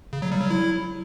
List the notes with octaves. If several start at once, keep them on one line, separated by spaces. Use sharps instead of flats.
C#3
F#3
G3
F#3
E4